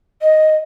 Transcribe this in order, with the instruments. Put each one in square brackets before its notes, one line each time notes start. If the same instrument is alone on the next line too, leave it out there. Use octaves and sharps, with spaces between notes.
[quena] D#5